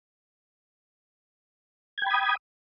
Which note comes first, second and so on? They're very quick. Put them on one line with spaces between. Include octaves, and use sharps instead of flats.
G#6 G5 B5 D#6